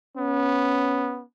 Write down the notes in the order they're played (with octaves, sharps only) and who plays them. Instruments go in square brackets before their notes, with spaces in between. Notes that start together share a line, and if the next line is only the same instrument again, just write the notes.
[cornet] B3 [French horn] C#4